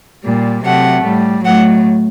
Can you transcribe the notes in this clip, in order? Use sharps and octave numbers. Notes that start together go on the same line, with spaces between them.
A#2 G3
C3 F#3 A3 F#5
A2 G3
A2 F#3 A3 F#5